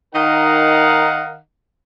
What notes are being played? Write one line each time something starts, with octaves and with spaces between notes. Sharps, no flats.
D#3 D#4 A#4 D#5 F5 F#5